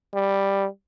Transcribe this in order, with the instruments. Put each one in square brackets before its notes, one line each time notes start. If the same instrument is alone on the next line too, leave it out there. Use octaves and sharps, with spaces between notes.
[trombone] G3